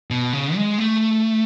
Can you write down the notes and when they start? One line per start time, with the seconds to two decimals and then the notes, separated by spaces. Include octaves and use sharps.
0.10 B2
0.33 C#3
0.56 G#3
0.78 A3